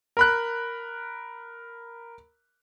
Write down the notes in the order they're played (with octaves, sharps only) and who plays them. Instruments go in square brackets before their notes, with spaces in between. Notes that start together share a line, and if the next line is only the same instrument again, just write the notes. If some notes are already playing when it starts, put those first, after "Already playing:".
[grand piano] A#4 B5 F#6